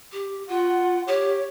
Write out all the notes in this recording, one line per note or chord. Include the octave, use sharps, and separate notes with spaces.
G4
F4 F#5
G4 C#5